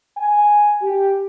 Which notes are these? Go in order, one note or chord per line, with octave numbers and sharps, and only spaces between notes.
G#5
G4